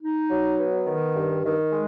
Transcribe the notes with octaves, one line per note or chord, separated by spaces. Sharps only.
D#4
F#3
B3
D#3
G2
D#3
G#3